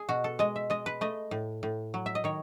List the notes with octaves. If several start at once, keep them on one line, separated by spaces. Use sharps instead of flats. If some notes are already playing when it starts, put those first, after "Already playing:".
Already playing: G#4
B2 F#4
A4
G#3 D#5
E5
G#3 D#5
B4
A3 D#5
A2
A2
F#3
E5
D#5
D#3 C#5